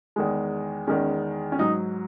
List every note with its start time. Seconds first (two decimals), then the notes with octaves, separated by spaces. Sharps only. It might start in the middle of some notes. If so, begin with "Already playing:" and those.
0.16 E2 D#3 G#3
0.87 E2 D#3 G#3 C#4
1.52 C#4
1.59 G#2 F#3 D#4